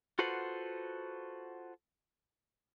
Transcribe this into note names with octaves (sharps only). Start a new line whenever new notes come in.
F4 F#4 A4 B4 C5 F#5